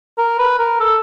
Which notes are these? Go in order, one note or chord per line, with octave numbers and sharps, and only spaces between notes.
A#4
B4
A#4
A4